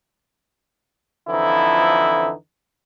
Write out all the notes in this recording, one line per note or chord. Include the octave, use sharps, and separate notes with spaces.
F2 D3 E3 F3 D#4 E4